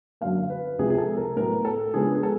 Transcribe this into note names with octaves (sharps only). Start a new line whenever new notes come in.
F#2 D3 F#3 A#3 F5
B4
C#2 C3 F3 G#4
G#4
A4
A#4
A2 F#3 B3 A#4
A4
C#3 F3 G#3 B3 D4 G#4
G#4
A4